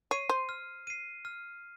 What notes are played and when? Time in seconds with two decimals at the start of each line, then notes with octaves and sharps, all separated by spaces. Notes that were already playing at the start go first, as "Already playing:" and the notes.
0.11 C#5 C7 D#7
0.29 C5
0.49 F6
0.87 C7 D#7
1.25 F6